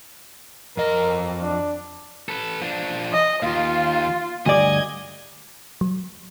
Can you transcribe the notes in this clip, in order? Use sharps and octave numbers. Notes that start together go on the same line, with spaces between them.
F2 A#4 D#5
D4
A4 B4
F3 D4
D#5
D#2 F4 F5
D2 G2 D5 D#5 G#5 G#6
F#3